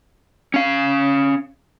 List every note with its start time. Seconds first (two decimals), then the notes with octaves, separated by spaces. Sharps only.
0.54 C#4 F5